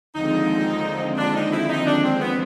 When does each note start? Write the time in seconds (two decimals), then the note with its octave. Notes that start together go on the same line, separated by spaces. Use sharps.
0.14 D#2 D3 F3 G#3 C4 D#4
1.17 D4
1.34 D#4
1.52 E4
1.69 D#4
1.86 D4
2.04 C4
2.21 B3